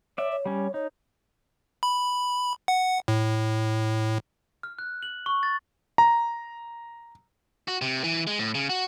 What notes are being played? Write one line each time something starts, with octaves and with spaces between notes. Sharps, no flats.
C#5 D5 E5
C#5
G3 C#4
D#4 C#5
B5
F#5
A2
F6
F#6
F#7
C#6
A6
A#5
F#4
C3
E3
G#3
A2
C#3
F#4